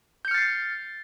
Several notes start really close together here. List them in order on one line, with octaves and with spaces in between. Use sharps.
G6 C#7 F6 A6 C7